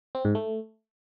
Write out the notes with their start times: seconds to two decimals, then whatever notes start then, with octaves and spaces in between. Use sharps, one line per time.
0.15 C4
0.25 G#2
0.35 A3